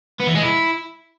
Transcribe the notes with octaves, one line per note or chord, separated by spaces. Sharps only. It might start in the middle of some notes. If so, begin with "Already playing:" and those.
B3
E3
G#3
E4